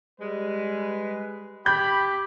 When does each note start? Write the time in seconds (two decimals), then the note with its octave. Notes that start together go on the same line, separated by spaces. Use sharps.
0.20 G3 G#3 B4
1.66 G4 B5 G6